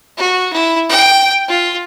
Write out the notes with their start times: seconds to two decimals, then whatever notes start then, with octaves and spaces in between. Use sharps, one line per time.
0.17 F#4
0.53 E4
0.90 G5
1.49 F4